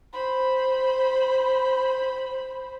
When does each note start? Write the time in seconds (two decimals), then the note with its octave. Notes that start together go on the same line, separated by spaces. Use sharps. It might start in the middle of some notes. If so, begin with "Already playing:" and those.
0.13 C5 B5